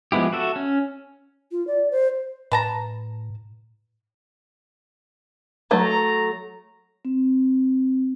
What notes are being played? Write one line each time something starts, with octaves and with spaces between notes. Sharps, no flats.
F3 G#3 B3 E4 G4
F#4 A4 E5
C#4
F4
D5
C5
A2 B4 A5 A#5
F#3 A3 A#5
C4